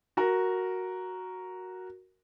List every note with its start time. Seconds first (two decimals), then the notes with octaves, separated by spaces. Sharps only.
0.17 F#4 A#4